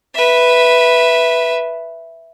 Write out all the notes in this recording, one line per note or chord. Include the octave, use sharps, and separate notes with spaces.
B4 E5